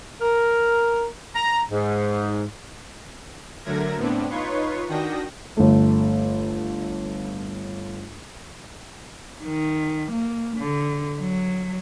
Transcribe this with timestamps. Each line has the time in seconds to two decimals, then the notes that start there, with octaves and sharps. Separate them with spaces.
0.20 A#4
1.36 A#5
1.71 G#2
3.64 D3 F#3 A3 A#4 G#6 A#6
3.97 A2 B3 C4 D4
4.29 D#4 F4 B4 C#5 C6 C#6
4.88 D#3 D4 F#4 G5 D#6 A#6
5.57 G1 A3
9.44 D#3
10.12 A#3
10.58 D3
11.19 F#3